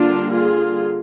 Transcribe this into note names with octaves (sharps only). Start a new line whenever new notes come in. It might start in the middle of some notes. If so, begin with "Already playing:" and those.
Already playing: D3 G3 A#3 D4 F4
F4 G#4